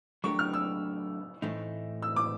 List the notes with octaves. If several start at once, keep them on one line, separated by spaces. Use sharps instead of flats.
F#3 A3 D4 G4 A#4 C#6
F6
E6
A2 E3 A3 C4 D#4
E6
D6